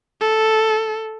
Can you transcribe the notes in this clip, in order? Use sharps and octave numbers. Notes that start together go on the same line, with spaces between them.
A4